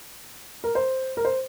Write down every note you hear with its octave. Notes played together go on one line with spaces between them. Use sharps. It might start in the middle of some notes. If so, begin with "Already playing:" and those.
A#4
C5
A#4
C5